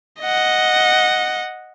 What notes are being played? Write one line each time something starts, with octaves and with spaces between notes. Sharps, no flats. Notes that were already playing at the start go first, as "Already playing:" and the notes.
D#5 F#5